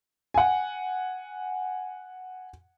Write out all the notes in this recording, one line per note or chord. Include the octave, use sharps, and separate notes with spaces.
F#5 G#5